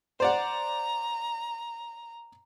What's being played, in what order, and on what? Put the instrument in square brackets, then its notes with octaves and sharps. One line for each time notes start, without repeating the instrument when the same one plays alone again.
[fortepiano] C5 D5 F#5 [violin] A#5